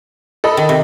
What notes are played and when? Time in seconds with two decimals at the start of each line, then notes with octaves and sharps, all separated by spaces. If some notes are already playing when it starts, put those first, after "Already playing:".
0.44 A4 D#5 B5
0.57 D#3
0.69 C3